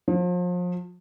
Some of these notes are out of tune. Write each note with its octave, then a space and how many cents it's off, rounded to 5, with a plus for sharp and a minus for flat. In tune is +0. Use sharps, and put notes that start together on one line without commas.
F3 +35